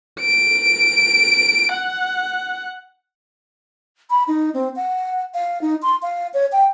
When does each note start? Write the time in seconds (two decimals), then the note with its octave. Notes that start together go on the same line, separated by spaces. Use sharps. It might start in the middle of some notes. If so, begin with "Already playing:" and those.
0.21 D7
1.74 F#5
4.10 B5
4.28 D#4
4.54 C4
4.76 F#5
5.34 F5
5.62 D#4
5.82 C6
6.02 F5
6.34 C#5
6.52 G5